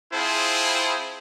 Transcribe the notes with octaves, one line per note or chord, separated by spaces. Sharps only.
C4 E4 F4 G#4 C5 A5